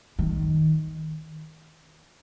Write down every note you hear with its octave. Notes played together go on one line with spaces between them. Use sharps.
D#3